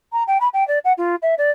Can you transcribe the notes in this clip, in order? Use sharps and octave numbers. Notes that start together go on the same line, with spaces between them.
A#5
G5
B5
G5
D5
F#5
F4
E5
D5